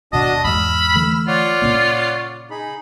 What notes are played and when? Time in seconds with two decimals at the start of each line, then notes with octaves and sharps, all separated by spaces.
0.13 D#1 B2 D4 F#4 D#5 A5
0.44 E2 G#2 B5 E6 F6
0.95 D3 E3 A3
1.28 F4 C#5 D5 F#5
1.62 A#2 C#3 A#3
2.51 D#4 G#4 B5